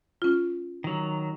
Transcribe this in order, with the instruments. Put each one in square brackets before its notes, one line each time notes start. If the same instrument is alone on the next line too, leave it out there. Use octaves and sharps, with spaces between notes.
[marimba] C#4 F4
[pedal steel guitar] D#3 F#3